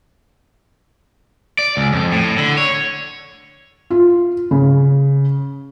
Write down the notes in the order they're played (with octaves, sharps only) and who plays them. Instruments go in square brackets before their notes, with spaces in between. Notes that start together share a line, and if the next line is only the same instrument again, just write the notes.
[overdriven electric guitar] D5
C#2
F2
A2
D3
C#5
[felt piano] F4
C#3